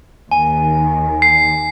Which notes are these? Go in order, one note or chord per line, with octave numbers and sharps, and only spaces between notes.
D#2 D#3 G#5
C7